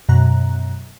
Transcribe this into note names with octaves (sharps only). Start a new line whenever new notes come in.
F#2 B2 A#5 F#6